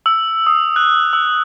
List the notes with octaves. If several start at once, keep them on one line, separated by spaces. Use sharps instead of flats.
E6
D#6
F#6
E6